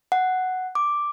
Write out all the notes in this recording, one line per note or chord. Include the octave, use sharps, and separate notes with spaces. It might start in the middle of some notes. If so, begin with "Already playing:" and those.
F#5
D6